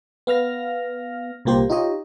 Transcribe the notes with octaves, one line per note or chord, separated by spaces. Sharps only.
B3 F5 F6 A#6
C2 A#2 A#3 G4 C5
D#4 F4 G4 C#5 D#5